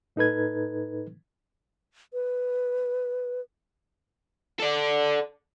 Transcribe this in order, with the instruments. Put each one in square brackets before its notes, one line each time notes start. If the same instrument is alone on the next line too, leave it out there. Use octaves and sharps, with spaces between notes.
[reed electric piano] A2 D#4 A4 B4 G#6
[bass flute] B4
[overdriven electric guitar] A4 D5